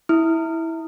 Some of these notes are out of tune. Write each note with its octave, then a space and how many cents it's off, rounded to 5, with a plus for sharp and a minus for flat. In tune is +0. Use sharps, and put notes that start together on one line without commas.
E4 -10 D#6 +0